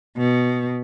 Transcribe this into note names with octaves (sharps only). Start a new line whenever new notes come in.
B2